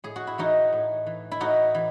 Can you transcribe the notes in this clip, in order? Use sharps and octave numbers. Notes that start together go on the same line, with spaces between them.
A2 G#4
F#4
E4
E3 D#4 F#4
A2
E3
E4
A2 D#4 F#4
E3